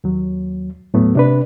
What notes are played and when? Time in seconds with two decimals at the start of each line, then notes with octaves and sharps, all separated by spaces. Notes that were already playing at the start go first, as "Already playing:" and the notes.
0.04 D#2 F#3
0.93 D#2 A2 F#3 A3 B3
1.15 C3 D4 B4